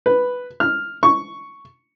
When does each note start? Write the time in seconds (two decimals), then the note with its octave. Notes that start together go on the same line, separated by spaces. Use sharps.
0.06 B4
0.60 F6
1.03 C#6